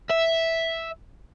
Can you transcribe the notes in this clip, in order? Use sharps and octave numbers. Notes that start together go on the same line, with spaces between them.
E5